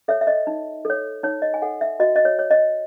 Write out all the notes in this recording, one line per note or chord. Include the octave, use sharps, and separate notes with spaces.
A4 C#5 E5
E5
D#5
D#4
A4 C#5
D#4 C#5
D#5
G#5
A4 C#5 F#5
E5
F#4 D#5
D#5
C#5
C#5
D#5